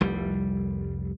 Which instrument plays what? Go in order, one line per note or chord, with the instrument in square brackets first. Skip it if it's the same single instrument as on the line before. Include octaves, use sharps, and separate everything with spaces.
[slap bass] F1 C2 G3